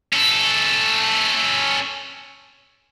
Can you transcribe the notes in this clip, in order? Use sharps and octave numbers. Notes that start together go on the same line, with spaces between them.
C#4 A4